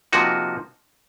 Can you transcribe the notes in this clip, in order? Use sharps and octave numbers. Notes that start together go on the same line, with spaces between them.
C3 F3 A#3 D#4 F#4